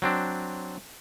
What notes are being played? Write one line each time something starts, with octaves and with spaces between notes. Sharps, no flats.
F#3 C4 D4